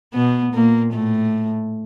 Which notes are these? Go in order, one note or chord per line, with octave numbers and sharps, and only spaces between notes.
B2 B3
A#2 A#3
A2 A3